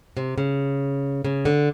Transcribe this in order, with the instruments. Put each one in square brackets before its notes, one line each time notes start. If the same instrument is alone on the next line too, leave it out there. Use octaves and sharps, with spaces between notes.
[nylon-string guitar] C3
C#3
C#3
D3